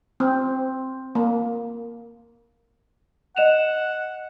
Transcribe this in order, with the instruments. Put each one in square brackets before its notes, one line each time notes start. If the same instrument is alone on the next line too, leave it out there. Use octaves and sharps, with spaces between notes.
[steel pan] C4
A#3
[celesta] D#5 E7 F7 [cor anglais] F#5